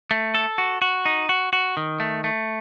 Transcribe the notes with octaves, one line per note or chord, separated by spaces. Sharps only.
A3
A4
F#4
F#4
D#4
F#4
F#4
D#3
A3
A3